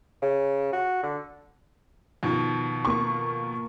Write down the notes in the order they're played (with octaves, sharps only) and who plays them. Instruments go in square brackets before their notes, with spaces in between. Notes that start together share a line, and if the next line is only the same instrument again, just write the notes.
[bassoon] C#3
F#4
D3
[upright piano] F2 B2 D#3
[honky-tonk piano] A#3 C#6